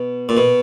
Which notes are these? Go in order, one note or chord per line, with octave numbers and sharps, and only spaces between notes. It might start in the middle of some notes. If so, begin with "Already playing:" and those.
Already playing: B2
A#2
B2